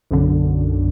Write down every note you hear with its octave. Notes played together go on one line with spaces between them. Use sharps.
B1 F#2 D3